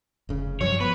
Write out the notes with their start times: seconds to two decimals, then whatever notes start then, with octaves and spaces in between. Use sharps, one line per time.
0.29 F1 C#3
0.61 G2 F3 F#3 C#5
0.80 F3 B3 B4